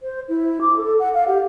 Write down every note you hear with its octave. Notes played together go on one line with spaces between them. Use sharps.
C5
E4
D6
A4
F#5
F5
G4